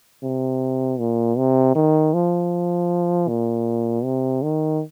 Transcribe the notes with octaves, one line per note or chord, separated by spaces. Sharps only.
C3
A#2
C3
D#3
F3
A#2
C3
D#3